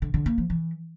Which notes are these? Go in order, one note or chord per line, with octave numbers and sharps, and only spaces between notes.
D3
D3
A#3
F3
E3